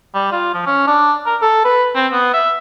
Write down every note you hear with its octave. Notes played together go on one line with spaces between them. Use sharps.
G3
F4
F3
C#4
D4
A#4
A4
B4
C4
B3
E5